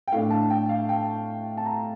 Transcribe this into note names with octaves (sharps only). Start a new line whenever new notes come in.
G5
A2 A3 D4 F5
A5
G5
F5
G5
A5
A#5